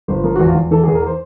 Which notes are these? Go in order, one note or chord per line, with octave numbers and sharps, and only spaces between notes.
G1 C5
F3 A#4
F#4
E2
F4
E2
E3 A4
G#4
E2
A#4
C5